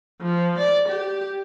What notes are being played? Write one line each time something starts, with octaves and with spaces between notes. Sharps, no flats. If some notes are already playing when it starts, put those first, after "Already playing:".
F3
D5
G4